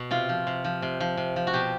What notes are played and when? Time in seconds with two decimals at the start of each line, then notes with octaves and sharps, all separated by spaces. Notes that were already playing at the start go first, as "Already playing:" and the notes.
Already playing: B2
0.11 C3 F4
0.29 F3
0.47 C3
0.64 F3
0.82 C3
1.00 F3
1.17 C3
1.36 F3
1.47 F#4
1.53 B2 G4